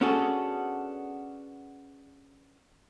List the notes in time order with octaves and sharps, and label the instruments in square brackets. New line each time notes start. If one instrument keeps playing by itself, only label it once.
[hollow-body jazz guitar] B3 C#4 D4 F#4 G#4 A4